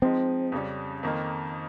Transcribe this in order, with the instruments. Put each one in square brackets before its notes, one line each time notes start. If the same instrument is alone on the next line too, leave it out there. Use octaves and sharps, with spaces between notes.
[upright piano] F3 G#3 D#4 [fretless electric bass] C4
[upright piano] F2 C#3 G3 C#4
F2 D#3 A#3 D#4